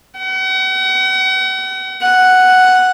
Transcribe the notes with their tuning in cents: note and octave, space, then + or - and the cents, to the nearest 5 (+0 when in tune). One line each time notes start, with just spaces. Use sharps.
F#5 +40
F#5 +0